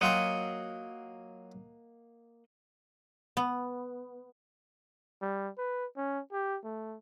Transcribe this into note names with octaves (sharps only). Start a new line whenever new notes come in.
F#3 A#3 F4 D#5 F#5 G5
B3
G3
B4
C#4
G4
A3